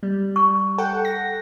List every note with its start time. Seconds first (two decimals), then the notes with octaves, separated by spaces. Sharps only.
0.03 G3
0.36 C#6
0.78 A4 F#5 G5
1.05 A#6